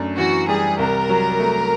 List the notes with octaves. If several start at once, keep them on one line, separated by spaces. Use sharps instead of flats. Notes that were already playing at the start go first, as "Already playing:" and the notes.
Already playing: F#2 A3 D4
E3 F#4
G3 G#4
C2 A#4
F#3
A3